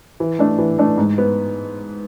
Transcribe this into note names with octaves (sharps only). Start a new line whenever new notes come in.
E3
A3 D4
E3
A3 D4
G#2
B3